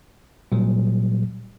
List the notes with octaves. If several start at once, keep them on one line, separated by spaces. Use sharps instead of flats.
A#2 F#3 G3